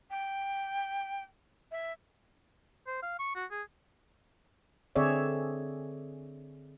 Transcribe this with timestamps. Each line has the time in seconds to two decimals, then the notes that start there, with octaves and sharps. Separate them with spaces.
0.10 G5
1.71 E5
2.87 C5
3.02 F5
3.19 C#6
3.36 F#4
3.51 G#4
4.96 D3 C4 G#4 C#5 D5 E5